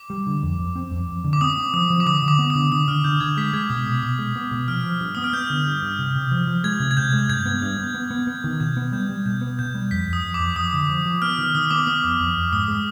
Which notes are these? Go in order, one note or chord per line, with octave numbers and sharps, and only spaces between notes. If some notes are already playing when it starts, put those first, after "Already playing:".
Already playing: D6
G3
D3
F2
F2
C4
F2
F2
D3
D6
C4 D#6
C4
F3 D#6
F3
D6
D3 D#6
D3
D6
B3
D3 D#6
D3 D#6
D3 F6
D3 G6
D3 G#6
G#3 B6
G#3 G#6
B2 D#6
B2 D#6
B2 D6
G#3
B3
B2
F3 F6
F3
G2
B3 D#6
F6
B3 G6
D3
G2
G2
C3
C3
F3
F3
G#3 G#6
C3
G#6
C3 G6
G#3
G2 G#6
B3
G2
B3
B3
B3
B3
D#3
B2 G6
B3
G3 G6
G3
B2 G6
B3
B2 G6
G3
F2 B6
F2
D#6
F2
D6
F2
F2 D#6
D3
F3
F3
B3 F6
D#3
D#3 D#6
B3 D6
B3 D#6
F2
F2
F2
G#2 D#6
G#3